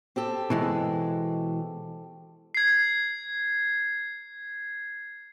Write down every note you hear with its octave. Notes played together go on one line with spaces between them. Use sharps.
C4 G4 A4
B2 E3 G#3
G#6 C7